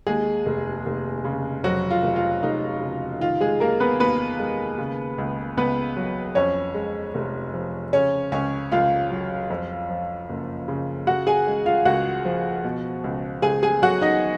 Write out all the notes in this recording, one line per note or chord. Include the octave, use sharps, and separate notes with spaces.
D#2 G#3 G#4
F1
F1
C#3
F2 F#3 F#4
F4
F1
F4
F1 D#4
C#3
D#3 F4
G#3 G#4
D#2 A#3 A#4
B3 B4
D#2 B3 B4
G#3
C#3
C#2
C#2 B3 B4
F#3
F2 C#4 C#5
G#3
F1
F3
C#3 C#4 C#5
C#2 C#4 C#5
C#2 F4 F5
F#3
F2
F3
F#1
C#3
C#3 F#4 F#5
G#4 G#5
G#3
F4 F5
C#2 F#4 F#5
F3
B2
C#2
C#2 G#4 G#5
G#4 G#5
F#3 F#4 F#5
D#4 D#5